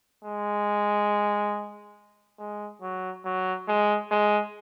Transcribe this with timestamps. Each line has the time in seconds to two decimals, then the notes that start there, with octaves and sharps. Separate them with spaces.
0.24 G#3
2.39 G#3
2.82 F#3
3.25 F#3
3.68 G#3
4.11 G#3